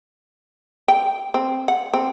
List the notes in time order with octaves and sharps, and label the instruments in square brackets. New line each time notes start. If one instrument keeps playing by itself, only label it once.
[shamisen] G5
C4
F#5
C4